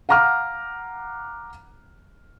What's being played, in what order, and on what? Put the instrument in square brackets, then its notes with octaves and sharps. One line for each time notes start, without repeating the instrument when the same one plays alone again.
[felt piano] F5 F#5 A#5 D6 F6